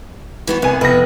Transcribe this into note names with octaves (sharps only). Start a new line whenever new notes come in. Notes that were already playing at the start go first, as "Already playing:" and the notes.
E3 B3 F#4
C2 B3 G#5
F1 B3 B4 A#6